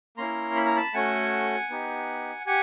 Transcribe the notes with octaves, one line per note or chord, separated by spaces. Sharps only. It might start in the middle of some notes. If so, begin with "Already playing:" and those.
A#3 C#4 E4 A#5 C6
B5
A#5
A5 B5
A3 C#4 F#4 A4 F#5 G#5
B3 D#4 G4
G4 F#5 G#5